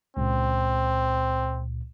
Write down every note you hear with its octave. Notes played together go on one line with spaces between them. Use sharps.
C#2 A#2 C4